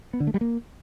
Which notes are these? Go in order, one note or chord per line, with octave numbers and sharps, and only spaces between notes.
B3
D3
A3
G3
A#3